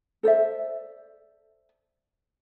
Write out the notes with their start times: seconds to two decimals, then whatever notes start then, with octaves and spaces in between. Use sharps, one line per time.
0.23 A4 C5 D5 E5